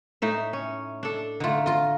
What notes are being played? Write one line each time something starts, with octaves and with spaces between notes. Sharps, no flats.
A2 D#4 E5
C#4
D4 A4
D3 A3 D#4 F4
F4 D#5